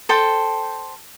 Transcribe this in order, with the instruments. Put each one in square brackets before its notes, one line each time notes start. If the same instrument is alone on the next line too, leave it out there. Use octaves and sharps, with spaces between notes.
[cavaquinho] A4 C5 G5 A5